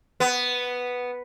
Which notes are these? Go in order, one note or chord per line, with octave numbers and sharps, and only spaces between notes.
B3